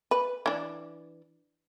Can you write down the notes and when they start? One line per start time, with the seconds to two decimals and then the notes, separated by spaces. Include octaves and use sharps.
0.11 B4
0.46 E3 D4